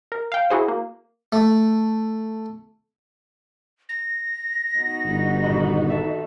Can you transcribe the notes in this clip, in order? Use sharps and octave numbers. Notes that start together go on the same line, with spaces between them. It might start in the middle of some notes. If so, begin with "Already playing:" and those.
A#4
F5 G5
E4 F#4 G#4 C5
A#3
A3
A#6
B3 D#4 F#4
G1
D#1 B5
A4 E5